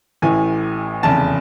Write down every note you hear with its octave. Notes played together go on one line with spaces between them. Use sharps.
A1 A2 E3 G#5
F1 E2 C#3 A5